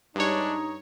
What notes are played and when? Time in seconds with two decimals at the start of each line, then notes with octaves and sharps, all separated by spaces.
0.16 G2 G#3 D4 D#4 C#5